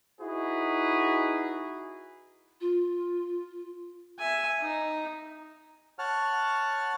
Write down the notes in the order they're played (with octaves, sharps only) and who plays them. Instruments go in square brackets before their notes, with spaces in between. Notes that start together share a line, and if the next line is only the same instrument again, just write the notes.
[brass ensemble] D#4 E4 F#4 G#4 B4
[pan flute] F4
[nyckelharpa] E5 G#5
D#4
[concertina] C#5 F#5 A5 F6